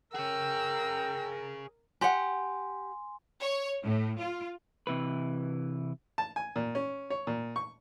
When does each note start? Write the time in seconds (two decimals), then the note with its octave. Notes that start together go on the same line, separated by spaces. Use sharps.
0.15 G#4 A#4 C#5 G5 E6
2.01 G4 F#5 G#5 C6
3.41 C#5
3.83 A2
4.19 F4
4.87 C3 E3 B4
6.18 A5
6.36 G#5
6.56 A#2
6.75 C#4
7.10 C#5
7.27 A#2
7.56 C#6